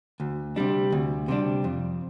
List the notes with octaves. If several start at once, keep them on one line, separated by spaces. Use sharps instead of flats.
D2
C3 G3 D4
D2
C3 G3 D4
F2